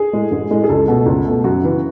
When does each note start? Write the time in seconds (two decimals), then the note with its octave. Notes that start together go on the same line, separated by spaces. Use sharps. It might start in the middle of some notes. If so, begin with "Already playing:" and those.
Already playing: G#4
0.13 A2 G#3
0.31 A1
0.50 A2 G#3
0.64 G#4
0.69 C#2 A4
0.88 B2 A3
1.06 C#2
1.25 B2 A3
1.44 F#2 F#4
1.62 C#3 E3